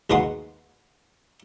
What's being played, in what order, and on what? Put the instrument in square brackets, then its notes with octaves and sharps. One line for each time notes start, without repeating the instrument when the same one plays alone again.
[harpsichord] D#2 B2 G#3 B4 F#5 C6